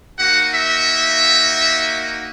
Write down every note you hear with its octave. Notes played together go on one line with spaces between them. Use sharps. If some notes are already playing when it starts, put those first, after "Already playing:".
A#3 D#4 F#4 F#5
E5